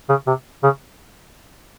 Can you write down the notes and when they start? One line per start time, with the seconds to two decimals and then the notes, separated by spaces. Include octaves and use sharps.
0.09 C#3
0.27 C3
0.63 C#3